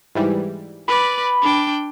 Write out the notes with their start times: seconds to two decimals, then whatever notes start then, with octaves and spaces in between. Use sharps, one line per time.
0.15 G#2 E3 G3
0.88 B4 D5 B5
1.41 D4 G5